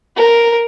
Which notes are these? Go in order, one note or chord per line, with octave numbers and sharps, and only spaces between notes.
A#4